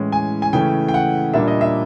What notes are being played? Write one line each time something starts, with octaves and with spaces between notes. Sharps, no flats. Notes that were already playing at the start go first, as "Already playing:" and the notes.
Already playing: A2 E3 G#3 C#4
G#5
G#5
C#3 E3 A3 C#4 G5
G5
F#5
A#2 G3 A#3 D4 E5
D#5
E5